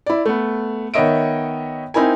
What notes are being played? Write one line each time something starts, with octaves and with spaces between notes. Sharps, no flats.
E4 D5
A3 B3
D#3 B3 C#5 D#5 E5 D7
C4 D#4 E4 A#4 G#5